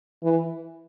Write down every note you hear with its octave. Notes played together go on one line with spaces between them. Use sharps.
E3